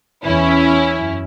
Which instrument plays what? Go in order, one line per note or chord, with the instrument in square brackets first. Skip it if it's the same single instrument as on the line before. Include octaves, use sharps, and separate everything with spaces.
[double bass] E2 [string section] C#4 E4
[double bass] F#2